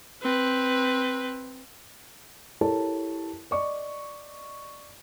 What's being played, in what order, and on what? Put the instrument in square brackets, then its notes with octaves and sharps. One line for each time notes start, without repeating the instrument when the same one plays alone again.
[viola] C4 B4
[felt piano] E4 G4 A4 A#4 C#5 A5
D5 D#5 C#6